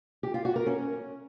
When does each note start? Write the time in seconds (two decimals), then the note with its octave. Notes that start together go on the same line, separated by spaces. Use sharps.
0.23 G4
0.34 F4
0.45 F#4
0.56 A#4
0.66 C#4